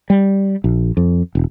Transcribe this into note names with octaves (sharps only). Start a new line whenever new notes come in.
G3
A#1
F2
E1